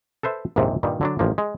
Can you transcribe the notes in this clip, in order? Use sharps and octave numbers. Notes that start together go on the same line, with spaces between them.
A4 B4 C5 E5
A#1 D#2 G#2 C3
G2 A#2 D#3 G3
D3 F#3 D4
A1 F3 A#3
G#3